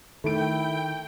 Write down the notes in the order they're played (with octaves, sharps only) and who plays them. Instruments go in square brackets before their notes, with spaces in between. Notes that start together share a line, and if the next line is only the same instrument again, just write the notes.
[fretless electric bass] D#3 [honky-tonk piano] A3 D7 [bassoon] E4 [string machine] G5